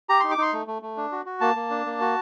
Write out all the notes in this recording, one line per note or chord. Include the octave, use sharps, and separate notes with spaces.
G4 A#5
D#4 C6
D6
D#4 C6
A3
A3
A3
D4
F#4
F#4
A#3 A5
A#3
D4
A#3
F#4